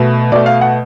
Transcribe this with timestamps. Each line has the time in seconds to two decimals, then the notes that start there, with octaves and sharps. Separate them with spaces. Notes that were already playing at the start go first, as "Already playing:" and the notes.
Already playing: B2 A3
0.32 B2 A3 D5
0.46 F5
0.61 F#5